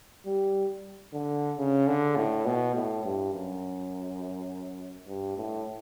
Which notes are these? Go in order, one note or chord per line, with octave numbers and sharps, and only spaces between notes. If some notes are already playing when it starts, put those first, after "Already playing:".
G3
D3
C#3
D3
A2
B2
A2
G2
F#2
G2
A2